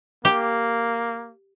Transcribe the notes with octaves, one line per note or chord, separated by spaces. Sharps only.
A#3 G4